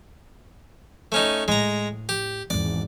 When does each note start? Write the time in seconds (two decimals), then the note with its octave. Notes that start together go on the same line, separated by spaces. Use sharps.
1.12 A3 C#4 D#4
1.48 A2 G#3 A#5
2.09 G4
2.50 G#1 E2 D5